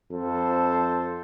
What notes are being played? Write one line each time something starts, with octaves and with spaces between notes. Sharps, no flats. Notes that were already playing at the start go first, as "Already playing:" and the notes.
F2 A4 C5